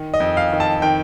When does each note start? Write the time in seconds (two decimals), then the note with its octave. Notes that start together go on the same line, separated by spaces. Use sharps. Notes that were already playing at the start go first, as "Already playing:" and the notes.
Already playing: D#3
0.14 D#5
0.20 F2
0.37 F5
0.52 D#3
0.60 A5
0.82 D#3 G5